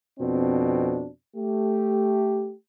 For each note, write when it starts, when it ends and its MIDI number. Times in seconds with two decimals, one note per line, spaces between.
0.19 1.08 41
0.19 1.08 47
0.19 1.08 60
0.19 1.08 62
1.35 2.53 57
1.35 2.53 67